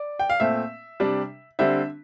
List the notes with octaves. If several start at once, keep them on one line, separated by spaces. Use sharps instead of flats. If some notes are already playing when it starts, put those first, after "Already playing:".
Already playing: D5
G5
F5
A#2 A3 C4 E5
C3 G3 D4
D3 G3 C4 E5